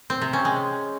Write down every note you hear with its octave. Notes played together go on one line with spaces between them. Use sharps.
C4
C3
C#4
G#3